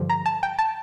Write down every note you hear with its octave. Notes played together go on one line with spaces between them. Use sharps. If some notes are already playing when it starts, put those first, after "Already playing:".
Already playing: G2 D3 F3
A#5
A5
G5
A5